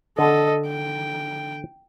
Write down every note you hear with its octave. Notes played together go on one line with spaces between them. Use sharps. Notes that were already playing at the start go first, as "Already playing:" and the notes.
D3 A4 D#5
G5